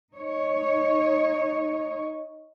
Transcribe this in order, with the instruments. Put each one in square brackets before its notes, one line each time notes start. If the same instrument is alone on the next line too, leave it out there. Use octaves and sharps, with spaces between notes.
[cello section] D#4 C#5